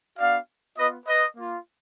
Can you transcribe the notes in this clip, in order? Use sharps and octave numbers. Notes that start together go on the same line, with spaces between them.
B3 D4 F#4 D5 F5
B3 F4 B4 D#5
B4 D#5
A#3 F4